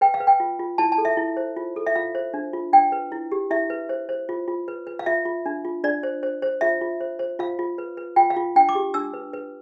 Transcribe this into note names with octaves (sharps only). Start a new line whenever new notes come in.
B4 G5
F5
B4
G5
F4
F4
E4 A5
A5
A4
E5
E4
C5
F4
A4
E5
F4 F5
C5
D4
F4
D4 G5
B4
E4
G4
E4 E5
B4
C5
C5
F4
F4
B4
B4
F5
F4 E5
F4
D4
F4
D4 D5
C5
C5
C5
F4 E5
F4
C5
C5
F4 F5
F4
B4
B4
F4 G5
F5
F4
D4 G5
D6
G4
D4 E6
B4
B4